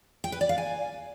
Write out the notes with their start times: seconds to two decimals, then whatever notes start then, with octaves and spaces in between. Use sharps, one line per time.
0.24 G5
0.32 B4
0.41 D5
0.49 F5
0.58 G#5